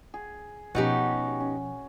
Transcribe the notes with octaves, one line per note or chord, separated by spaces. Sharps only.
G#4
B2 F3 B3 C#4 D#4 F#4 G4
C#4